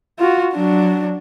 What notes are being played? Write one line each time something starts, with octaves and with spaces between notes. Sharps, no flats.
F4 F#4
F#3 D4